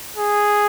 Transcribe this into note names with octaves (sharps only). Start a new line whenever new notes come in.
G#4